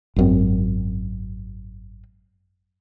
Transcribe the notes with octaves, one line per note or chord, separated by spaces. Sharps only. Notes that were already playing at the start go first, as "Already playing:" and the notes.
G#1 F#2 C4